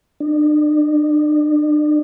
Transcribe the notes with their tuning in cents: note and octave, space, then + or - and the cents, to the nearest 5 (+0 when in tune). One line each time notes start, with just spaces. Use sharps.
D4 +40